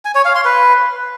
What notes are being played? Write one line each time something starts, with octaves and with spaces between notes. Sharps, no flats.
G#5
C#5
F5
C6
B4